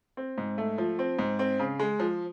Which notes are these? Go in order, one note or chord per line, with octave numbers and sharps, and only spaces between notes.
C4
G#2
A3
F3
C4
G#2
C4
C#3
G#3
F3